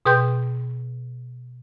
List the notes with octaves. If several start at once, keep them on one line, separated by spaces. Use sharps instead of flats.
B2 G#4 B4 G5 C6 G6